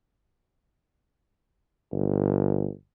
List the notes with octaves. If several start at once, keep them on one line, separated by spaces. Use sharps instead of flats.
G1